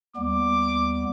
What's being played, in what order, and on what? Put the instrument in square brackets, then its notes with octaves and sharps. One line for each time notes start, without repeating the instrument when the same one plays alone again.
[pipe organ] D#2 G3 B3 [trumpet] D6